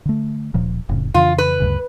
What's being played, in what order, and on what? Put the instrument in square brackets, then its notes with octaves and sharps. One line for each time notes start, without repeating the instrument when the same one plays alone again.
[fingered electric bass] D3 A3
D1 A#2 F3
F1 A2 C#3
[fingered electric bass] F2 C#3 E3 [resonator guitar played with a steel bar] F4
[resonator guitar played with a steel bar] B4
[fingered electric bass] D2 G2 C#3